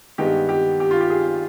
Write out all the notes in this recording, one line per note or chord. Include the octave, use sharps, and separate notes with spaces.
G2 D#3 G#3 B3 G4
G4
G4
F4
G4
G#4